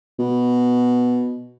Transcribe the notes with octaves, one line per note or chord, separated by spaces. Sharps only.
B2